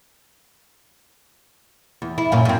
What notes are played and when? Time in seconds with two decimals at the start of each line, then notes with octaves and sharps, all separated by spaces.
2.02 E2
2.18 E4
2.32 F#2 A#2 C#4
2.45 F#2 C4